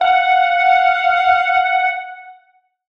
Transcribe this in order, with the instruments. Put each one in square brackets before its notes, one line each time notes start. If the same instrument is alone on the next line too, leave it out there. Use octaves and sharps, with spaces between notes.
[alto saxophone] F5 [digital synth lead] F#5